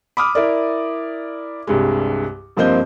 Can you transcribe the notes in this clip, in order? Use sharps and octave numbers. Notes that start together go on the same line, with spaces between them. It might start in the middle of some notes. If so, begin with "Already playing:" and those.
B5 D6 D#6 F6
E4 A#4 D5
C2 G2 G#3
G2 F3 A#3 C4 D#5 G6